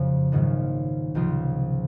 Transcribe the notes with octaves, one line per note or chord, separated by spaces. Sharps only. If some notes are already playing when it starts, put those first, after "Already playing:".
Already playing: F#1 F2 C#3 F3
A#1 G#2 D#3 F#3 A#3
C#2 C3 F3 C4 F4